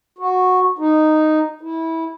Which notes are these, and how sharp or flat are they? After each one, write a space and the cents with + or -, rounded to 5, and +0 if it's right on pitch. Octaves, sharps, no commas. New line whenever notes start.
F#4 -10
D#4 -5
E4 -20